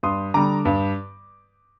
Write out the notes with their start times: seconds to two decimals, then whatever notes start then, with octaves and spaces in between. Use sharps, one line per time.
0.03 G2 C6 D#6
0.34 D3 G3 A#5 D6
0.65 G2